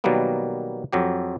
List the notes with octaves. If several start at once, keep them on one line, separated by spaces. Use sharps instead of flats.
B2 D#3 F#3 G3 A#3 B3
F2 F#3 G4